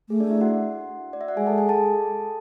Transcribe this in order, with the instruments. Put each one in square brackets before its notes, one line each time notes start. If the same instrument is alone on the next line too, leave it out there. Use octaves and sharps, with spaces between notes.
[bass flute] A3 [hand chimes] G#4
[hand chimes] D4 D5
E4 E5
F#4 F#5
D5
E5
F#5
[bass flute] G#3 [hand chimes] G#4 G#5
[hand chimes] A4 A5
G#4 G#5
A4 A5